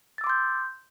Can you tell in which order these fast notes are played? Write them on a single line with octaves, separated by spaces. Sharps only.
A6 E6 D6 C6 G6